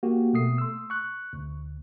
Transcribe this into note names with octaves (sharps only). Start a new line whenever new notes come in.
A#3 F#4 G4
B2 A3 D#6 C7
C6 E6
C#6 F#6
D2